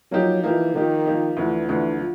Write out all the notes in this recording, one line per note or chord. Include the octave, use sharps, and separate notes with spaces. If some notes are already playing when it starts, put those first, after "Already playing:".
F3 F#3 A#3 D#4 G4
E3 F3 A#3 D#4 G4
D#3 F3 A#3 D#4 G4
F3 A#3 D#4 G4
D2 D3 E3 F3
D2 D3 E3 F3
F3